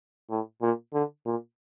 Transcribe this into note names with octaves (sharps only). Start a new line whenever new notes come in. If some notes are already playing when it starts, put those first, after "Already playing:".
A2
A#2
D3
A#2